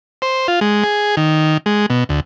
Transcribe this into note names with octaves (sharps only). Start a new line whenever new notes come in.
C5
F4
G#3
G#4
D#3
G#3
B2
D2